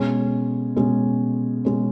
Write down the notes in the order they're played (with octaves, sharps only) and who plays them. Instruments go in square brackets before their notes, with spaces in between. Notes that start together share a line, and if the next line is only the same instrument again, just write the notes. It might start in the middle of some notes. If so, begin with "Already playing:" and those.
Already playing: [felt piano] B2 G#3 C#4
B2 G#3 C#4
B2 G#3 C#4